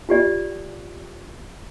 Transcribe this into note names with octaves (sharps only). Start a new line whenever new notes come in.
F4 G4 D5